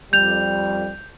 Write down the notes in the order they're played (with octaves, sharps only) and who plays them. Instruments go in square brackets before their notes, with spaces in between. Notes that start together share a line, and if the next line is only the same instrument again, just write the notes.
[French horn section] F2 G3 [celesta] G6 F7